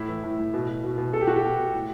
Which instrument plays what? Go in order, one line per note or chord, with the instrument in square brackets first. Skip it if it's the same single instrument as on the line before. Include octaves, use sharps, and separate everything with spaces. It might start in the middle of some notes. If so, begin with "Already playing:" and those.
Already playing: [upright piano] A2 E4
E3
A2
A2
B2
B2
B2
B2
B2 A4
G4
B2 F#4
G4
B2
B2
A2